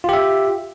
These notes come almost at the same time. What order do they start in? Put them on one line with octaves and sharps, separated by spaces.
F4 G4 E5